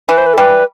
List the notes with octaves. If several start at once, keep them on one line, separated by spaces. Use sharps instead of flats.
E3 B4
C5
B4
A4
G3 B4